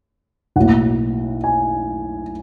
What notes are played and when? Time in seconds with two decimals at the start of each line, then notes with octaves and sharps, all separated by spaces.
0.56 B1 A2 F#3 A#3 F#5
1.44 G#5